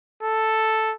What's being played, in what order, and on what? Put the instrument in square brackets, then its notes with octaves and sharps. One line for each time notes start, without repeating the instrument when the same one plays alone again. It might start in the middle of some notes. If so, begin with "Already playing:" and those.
[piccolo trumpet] A4